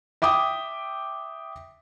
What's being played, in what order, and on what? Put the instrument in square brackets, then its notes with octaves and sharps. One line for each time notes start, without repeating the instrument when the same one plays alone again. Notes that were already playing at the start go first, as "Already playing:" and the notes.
[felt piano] E5 G5 D6 D#6